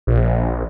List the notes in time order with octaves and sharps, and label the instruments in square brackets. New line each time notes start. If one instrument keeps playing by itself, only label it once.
[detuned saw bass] A#1